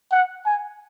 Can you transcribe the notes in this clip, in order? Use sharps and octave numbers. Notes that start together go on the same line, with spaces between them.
F#5
G#5